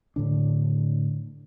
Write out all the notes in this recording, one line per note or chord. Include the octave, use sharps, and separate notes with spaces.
A2 D3 D4